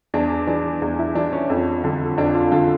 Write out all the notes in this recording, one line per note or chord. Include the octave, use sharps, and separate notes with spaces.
E2 D4
E3 D4
E2 D4
E4
E3 D4
C#4
F2
D3
F2 D4
F4
D3 F4